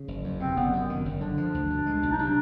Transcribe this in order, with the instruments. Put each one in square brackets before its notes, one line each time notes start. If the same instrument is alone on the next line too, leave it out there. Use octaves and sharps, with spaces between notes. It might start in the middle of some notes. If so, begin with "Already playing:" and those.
Already playing: [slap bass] C#3
F#1
E2
[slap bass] C3 [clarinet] C4
[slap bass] F#1 [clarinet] B3
[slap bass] F#2
D#3
F#1
[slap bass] D3 [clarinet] D4
[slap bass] F3
D2
B2
G#3
B1
[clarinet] D#4
[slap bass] C3 [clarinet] D4